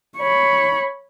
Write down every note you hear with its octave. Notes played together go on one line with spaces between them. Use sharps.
C#5 B5